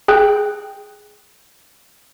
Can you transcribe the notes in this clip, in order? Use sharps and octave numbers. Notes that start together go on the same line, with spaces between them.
G#4 G5 F#6